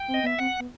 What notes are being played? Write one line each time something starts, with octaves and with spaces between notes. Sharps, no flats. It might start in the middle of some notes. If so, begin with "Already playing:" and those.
Already playing: G5
C4
D#5
B3 E5
C4 F#5
B3